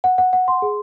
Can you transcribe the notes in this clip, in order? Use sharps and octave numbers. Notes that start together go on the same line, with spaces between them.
F#5
F#5
F#5
C6
G#4